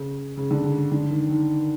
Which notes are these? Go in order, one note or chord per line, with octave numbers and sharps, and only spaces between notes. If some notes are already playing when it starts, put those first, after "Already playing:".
Already playing: C#3
C#3
D3
C#3
D3
D#3
D#3